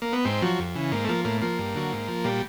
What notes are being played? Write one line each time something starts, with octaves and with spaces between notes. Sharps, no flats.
A#3
B3
G#2 C4
F3 F#3
F2
C#3 E3
G#2 A#3
A3
F3 A#3
A2 A#3
F3 A#3
G2
D3 F#3
G#2
F3
A#2 G3